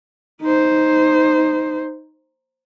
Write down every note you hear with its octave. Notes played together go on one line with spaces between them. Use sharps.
D#4 C5